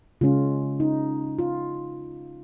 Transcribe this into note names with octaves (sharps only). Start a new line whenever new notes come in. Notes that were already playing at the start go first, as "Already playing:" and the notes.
C#3 G#3 C#4 F4
D#4
F4